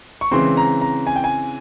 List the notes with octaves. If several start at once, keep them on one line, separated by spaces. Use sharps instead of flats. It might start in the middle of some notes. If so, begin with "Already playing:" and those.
C#6
C#3 E3 G#3 C4 C6
A#5
A#5
G#5
G5
G#5